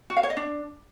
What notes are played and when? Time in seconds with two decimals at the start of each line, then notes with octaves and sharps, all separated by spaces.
0.10 F#4
0.17 F5
0.23 C#5
0.30 D#5
0.37 D4